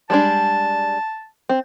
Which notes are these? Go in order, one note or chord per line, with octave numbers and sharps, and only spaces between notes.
G3 G#3 D4 A5
C4